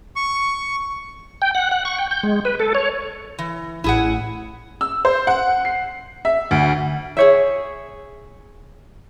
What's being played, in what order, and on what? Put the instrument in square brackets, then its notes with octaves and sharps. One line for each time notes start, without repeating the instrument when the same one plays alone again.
[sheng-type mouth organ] C#6
[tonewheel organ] G5
F#5
F#5
C#6
G5
G6
G#3
B4
A4
C#5
[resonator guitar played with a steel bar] E3
[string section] A1 [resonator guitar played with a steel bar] E4 G#4 F#5
[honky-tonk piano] E6
C5
F#5
C7
E5
D2
[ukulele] G#4 C#5 E5